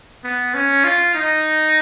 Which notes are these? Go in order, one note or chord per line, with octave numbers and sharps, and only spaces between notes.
B3
C#4
F4
D#4